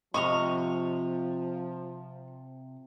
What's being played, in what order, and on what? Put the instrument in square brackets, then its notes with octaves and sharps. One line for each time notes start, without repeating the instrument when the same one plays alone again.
[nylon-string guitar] C3 D#5 [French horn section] F3 [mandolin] C#6 D#6 F6